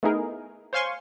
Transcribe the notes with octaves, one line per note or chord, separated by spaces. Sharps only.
A3 B3 D#4 E4 G#4 A#4
C5 C#5 F5 G#5 C6 C#6